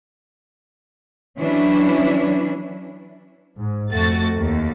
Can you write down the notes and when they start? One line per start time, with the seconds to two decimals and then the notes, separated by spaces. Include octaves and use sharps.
1.36 E3 F#3 C#4 D4 E4
3.58 G#2
3.92 F2 A3 F#4 A6
4.35 D#2